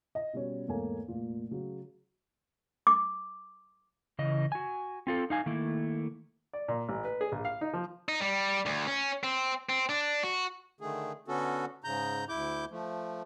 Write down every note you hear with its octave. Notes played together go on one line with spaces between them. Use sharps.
D#5
B2 G3 C#4
E2 G#2 A3 A#3 C#5 G#5
F1 A#2 F4
C#3 F#3
D6
C#3 E3 D#5
F#4 G#5
C4 F4 A4
D#4 F5 G#5
D#3 A3 A#3 E4
D5
A#2
A1
B4
G#4
A#1
F5
D#4
F3
D#4
G3
D2
C#4
C4
C4
D4
F#4
D3 D#3 A3 G#4
D3 B3 C#4 F#4 A4
G#2 C#3 A#5 G6
D2 E4 D6 G6
F3 A3